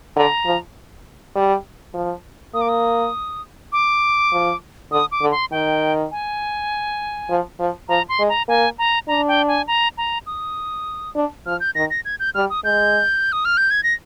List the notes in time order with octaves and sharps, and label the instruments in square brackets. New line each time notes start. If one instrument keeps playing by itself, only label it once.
[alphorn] D3 [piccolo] A#5
[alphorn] F3
G3
F3
[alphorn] A#3 [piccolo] D#6
[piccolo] D6
D#6
D6
[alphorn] F3
[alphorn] D3 [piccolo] D#6
[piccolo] D6
[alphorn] D3
[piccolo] C6
[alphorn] D#3 [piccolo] G5
[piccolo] G#5
[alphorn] F3
F3
[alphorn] F3 [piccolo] A#5
[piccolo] C6
[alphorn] G#3
[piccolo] A#5
[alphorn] A#3 [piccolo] G#5
[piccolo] A#5
[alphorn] D4 [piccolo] A#5
[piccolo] G5
G#5
A#5
A#5
D#6
[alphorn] D4
[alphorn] F3 [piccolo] F6
[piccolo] G6
[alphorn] D#3 [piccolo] A#6
[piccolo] A#6
G#6
G6
[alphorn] G3 [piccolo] F6
[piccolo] D#6
[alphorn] G#3 [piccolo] G6
[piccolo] D#6
F6
G6
G#6
A#6